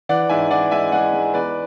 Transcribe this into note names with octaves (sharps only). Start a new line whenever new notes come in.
E3 D5 F#5
G#2 E5 G#5
E3 D5 F#5
G#3 E5 G#5
G#3 D5 F#5
G#3
E2 B4 D5